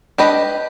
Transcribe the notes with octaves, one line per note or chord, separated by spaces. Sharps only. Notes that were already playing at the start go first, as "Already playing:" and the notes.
D4 G4 B4 D#5